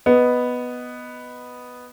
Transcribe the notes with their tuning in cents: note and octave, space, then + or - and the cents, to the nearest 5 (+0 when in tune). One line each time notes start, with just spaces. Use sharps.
B3 +0 D#5 +0